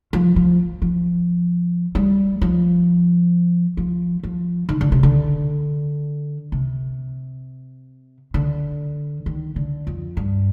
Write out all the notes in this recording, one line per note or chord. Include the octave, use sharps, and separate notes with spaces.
F3
F3
F3
G3
F3
F3
F3
D#3
D3
C3
D3
C3
D3
D#3
D3
F2
G2